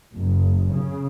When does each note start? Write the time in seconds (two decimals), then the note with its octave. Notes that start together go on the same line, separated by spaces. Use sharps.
0.14 F#1
0.70 C#3